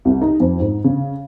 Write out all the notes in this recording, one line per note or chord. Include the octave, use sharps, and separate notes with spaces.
C2
D#4
F2
G#2
C#3